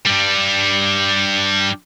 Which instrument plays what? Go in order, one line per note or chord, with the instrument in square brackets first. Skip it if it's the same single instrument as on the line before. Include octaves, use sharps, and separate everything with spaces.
[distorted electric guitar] G2 G3